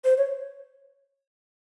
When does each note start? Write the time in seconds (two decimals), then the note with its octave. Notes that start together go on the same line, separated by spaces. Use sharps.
0.05 C5
0.18 C#5